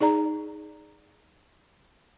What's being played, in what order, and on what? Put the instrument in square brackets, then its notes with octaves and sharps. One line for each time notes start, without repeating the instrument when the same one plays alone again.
[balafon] D#4 G#4 D5 A#5